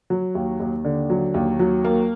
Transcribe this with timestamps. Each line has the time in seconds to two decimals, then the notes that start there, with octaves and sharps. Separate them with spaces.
0.10 F#3
0.35 D#2
0.60 D#2
0.85 D3
1.10 F#3
1.34 D#2
1.59 F#3
1.84 A#3